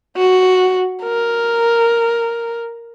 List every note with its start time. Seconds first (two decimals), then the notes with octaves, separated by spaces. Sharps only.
0.17 F#4
1.04 A#4